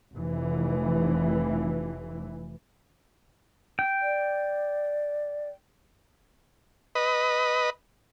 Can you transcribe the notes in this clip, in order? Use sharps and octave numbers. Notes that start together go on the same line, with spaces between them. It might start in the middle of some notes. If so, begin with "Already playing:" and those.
F1 E3
G5
D5
B4 D#5